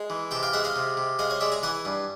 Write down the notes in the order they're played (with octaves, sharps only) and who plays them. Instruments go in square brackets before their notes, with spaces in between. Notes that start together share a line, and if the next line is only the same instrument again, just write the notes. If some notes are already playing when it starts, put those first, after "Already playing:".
Already playing: [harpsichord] G#3
E3
C3 G5 A5
F5 G5
G#3 E5 F#5
D#5 F5
C3
C3
G#3 D#5 F5
C#5 D#5
G#3 D5 E5
G#5 A#5
E3 F#5 G#5
G2